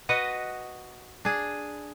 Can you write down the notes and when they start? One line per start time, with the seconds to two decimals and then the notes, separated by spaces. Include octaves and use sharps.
0.09 F#4 B4 D#5 F#5
1.25 D4 G#4